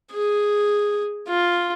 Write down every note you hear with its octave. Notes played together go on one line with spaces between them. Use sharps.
G#4
F4